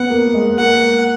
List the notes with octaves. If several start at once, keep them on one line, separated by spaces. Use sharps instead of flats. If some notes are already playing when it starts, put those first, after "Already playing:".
Already playing: B3 F#5
A#3
G#3
A#3 F#5